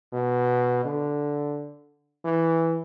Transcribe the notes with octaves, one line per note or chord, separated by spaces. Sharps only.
B2
D3
E3